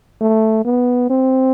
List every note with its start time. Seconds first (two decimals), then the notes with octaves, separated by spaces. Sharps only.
0.21 A3
0.65 B3
1.10 C4